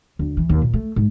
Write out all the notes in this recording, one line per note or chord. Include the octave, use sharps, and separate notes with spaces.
D2
E3
D#2
A#2
A3
G#2